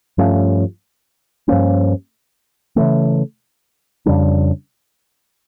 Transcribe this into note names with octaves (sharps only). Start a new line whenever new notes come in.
G2 F3 A3 C#4
G2 F3 A#3 C#4
C#3 E3 A3
F2 C#3 G3 D4